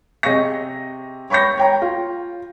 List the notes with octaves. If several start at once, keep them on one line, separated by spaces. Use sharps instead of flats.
C3 G#4 D#5 C#6 A#6
C#5 B5 C#6 G6 A#6
C#5 G5 A#5
F4